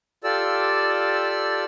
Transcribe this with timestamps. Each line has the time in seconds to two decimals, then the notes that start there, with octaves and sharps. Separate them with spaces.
0.24 F4 G4 A4 D5 E6